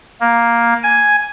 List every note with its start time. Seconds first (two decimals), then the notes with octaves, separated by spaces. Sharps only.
0.21 A#3
0.83 G#5